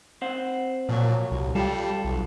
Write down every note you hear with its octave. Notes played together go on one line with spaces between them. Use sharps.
C4 C5 F#5
A#2 F3 F#3 C#5
C2
G3 F4 A4
B1